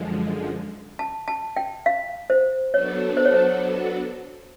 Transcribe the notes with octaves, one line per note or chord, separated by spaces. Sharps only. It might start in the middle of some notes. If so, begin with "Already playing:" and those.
Already playing: F#2 D3 F3 G#3
A5
A5
G5
F5
C5
F#3 B3 D4 F#4 A4 C#5
C5
C#5
C5